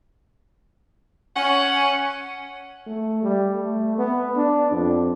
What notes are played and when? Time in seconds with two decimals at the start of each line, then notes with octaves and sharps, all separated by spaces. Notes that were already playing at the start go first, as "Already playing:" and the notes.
1.36 C#4 F#5
2.86 A3
3.22 G3
3.55 A3
3.98 B3
4.36 D4
4.72 F2